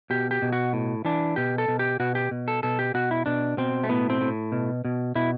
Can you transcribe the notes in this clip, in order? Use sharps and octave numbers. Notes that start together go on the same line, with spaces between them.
B2 G4
G4
B2
F#4
A2
E3 D4
B2 G4
A4
B2
G4
B2 F#4
G4
B2
A4
B2 A4
G4
B2 F#4
E4
B2 D4
B2 C4
A3
A2 B3
C4
A2
B2
B2
B2 E4